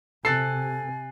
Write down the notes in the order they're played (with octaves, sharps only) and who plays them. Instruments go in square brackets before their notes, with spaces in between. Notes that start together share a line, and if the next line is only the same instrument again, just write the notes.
[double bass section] C3 [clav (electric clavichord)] A4 [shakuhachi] G#5 [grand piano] F#6 A6 C7